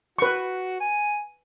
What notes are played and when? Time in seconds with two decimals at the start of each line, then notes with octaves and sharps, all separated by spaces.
0.19 F#4 B4 C#6
0.81 G#5